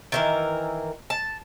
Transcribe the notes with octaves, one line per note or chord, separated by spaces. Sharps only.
D#3 E3 A#4
A5